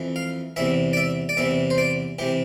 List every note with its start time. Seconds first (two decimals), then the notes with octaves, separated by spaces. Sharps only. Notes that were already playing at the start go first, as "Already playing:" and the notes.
Already playing: F2 E3
0.16 F5
0.56 E2 C3 E3 E5
0.93 D5
0.97 E5
1.29 D5
1.37 E2 C3 E3 E5
1.70 C5
1.78 D5
2.19 C3 E3 G4